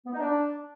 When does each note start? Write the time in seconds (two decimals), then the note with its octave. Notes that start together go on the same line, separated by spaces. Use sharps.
0.06 B3
0.13 D#4
0.19 D4